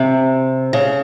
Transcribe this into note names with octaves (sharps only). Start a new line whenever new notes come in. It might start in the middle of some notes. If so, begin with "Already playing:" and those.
Already playing: C3
C#3